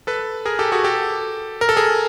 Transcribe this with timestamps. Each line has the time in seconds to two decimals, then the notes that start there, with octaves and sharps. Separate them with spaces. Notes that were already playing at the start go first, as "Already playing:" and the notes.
0.07 A4 B4
0.45 G#4 A#4
0.59 G4 A4
0.72 F#4 G#4
0.84 G4 A4
1.61 A#4
1.69 A4
1.77 G#4 A#4